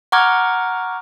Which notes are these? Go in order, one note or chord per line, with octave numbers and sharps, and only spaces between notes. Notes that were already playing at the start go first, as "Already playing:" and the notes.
F#5 A#5 C#6 D6 F6 G#6